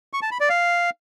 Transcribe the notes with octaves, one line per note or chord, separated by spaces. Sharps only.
C#6
A5
B5
D5
F5